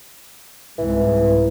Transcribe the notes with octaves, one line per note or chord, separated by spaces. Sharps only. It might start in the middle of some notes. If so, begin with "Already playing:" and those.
C2 G#2 E3